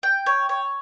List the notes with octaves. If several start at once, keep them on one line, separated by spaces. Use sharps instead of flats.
G5
C#5
C#5